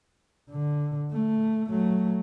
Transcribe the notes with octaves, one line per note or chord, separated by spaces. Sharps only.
D3
A3
F#3 A3